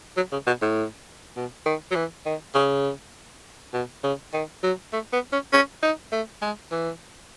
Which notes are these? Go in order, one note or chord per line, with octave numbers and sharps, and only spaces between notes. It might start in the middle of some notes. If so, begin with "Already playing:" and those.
F#3
C#3
B2
A2
B2
D#3
F#3
E3
D#3
C#3
B2
C#3
D#3
F#3
A3
B3
C#4
C#4
D#4
A3
G#3
E3